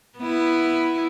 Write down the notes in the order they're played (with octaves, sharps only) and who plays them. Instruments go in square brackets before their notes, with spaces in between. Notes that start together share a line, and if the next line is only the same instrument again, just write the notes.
[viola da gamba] B3 E4